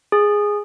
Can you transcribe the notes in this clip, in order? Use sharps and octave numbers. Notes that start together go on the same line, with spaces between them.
G#4